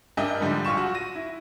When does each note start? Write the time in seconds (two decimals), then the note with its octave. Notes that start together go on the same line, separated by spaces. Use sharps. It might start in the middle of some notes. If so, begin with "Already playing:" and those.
0.17 G2 D4 A#4 D#5 E5
0.41 G#2 D3 F3 G3
0.65 A#1 F4 C#6 E7
0.77 F#4
0.95 A#6 D#7
1.15 E4